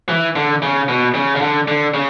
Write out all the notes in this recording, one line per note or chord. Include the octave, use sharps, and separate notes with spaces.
E3
D3
C#3
B2
C#3
C#3
D3
D3
C#3